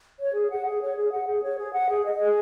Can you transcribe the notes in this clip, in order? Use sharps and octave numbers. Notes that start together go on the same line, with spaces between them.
C#5
G#4
F#5
G#4
C#5
G#4
F#5
G#4
C#5
G#4
F#5
G#4
D#5
G#4